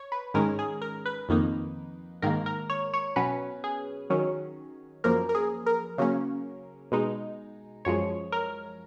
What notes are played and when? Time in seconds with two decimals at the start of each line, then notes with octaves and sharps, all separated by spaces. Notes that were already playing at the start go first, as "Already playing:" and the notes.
Already playing: C#5
0.12 B4
0.34 G#2 D#3 G#3 C#4 A#4
0.59 G#4
0.82 A#4
1.06 B4
1.29 F2 D#3 A#3 D#4
2.22 G#2 D#3 A#3 A#4
2.46 A#4
2.70 C#5
2.94 C#5
3.16 B2 F#3 C#4 B4
3.64 G#4
4.10 D#3 F#3 C#4
5.04 F#2 F3 A#3 A#4
5.29 A#4
5.35 G#4
5.66 A#4
5.98 C#3 F#3 A#3 C#4
6.92 B2 G#3 D#4
7.85 F#2 F3 G#3 C#5
8.32 A#4